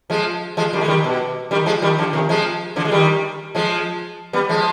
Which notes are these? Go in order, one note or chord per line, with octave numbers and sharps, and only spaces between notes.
F3 G#3
F3 G#3
D#3 G3
G#3
D#3 G3
B2
D#3 G3
F3 G#3
D#3 G3
D3 F3
C3 D#3
F3 G#3
D3 F3
G#3
D#3 G3
F3 G#3
G3 B3
F3 G#3